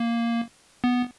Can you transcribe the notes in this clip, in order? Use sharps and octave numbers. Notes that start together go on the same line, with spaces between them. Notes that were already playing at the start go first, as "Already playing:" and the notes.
Already playing: A#3
B3